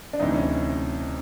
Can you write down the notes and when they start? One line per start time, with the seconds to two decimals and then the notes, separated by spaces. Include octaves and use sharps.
0.13 D4
0.19 D2 C3 E3 D#4
0.34 C#4